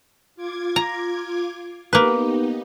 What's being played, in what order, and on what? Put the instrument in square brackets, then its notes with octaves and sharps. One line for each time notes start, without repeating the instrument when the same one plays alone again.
[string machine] F4 D6 G#6
[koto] A#5
[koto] A#3 B4 [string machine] B3 D#4 G4